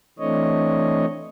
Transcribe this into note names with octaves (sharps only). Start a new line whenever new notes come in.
E3 A3 C4 D4 C#5 D#5